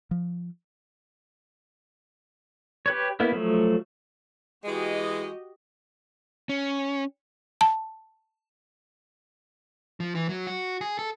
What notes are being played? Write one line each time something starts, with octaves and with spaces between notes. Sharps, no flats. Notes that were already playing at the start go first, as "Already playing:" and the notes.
F3
G4 B4 C#5
A#3 B3 E4
F3 F#3 A3
E3 G#3 F#4 G4 D#5
C#4
A5
F3
E3
F#3
F#4
G#4
A4